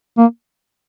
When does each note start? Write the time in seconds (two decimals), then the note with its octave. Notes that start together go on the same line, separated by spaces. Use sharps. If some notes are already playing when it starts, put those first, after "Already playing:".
0.18 A#3